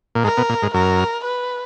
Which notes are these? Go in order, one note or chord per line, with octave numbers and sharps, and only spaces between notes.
A#2
G#2 A#4
B2
A#2
G#2
F#2 A#4
B4